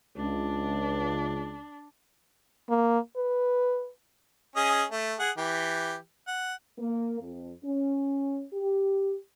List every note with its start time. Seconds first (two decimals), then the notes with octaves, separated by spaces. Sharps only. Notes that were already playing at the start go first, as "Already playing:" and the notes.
0.17 C#2 D4
2.69 A#3
3.16 B4
4.56 C#4 G#4 D#5
4.92 A3
5.19 G#4 F#5
5.37 E3 G4
6.27 F#5
6.78 A#3
7.21 F2
7.63 C#4
8.52 G4